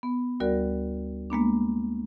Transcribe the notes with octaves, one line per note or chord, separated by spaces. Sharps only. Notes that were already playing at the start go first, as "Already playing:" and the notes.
B3
D2 G3 F#4 A#4 D5
G#3 A#3 B3 D4